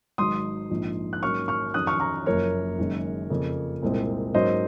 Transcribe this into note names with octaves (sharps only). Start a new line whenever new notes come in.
G#1 G#2 F#3 C6 D#6
A#1 G#2 F3
F#6
G#2 F#3 A#3 C#4 C#6 F6
C#6 F6
F2 D#3 F#3 C#4 D#6 F#6
C#6 F6
A#5 C#6
F#1 F#2 F3 A#3 A#4 C#5
F#1 F#2 D#3 G#3 C#4
F2 C#3 F3 A#3
C2 A#2 G#3 C4
G#2 F#3 A#3 C#4 C5 D#5